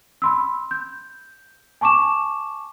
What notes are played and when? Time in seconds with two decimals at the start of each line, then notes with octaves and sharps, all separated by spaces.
0.22 B5 C6 E6
0.71 G6
1.81 G#5 A5 C#6 D6 E7